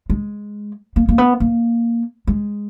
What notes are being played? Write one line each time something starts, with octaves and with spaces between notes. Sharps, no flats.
G#3
A#3
A#3
B3
A#3
G#3